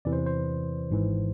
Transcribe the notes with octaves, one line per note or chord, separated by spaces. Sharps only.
E2 C3 E3 D5
C5
B4
C5
G#1 G#2 E3